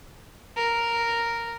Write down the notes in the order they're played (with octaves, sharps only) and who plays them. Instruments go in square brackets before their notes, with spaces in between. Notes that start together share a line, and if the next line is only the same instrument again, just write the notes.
[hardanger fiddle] A#4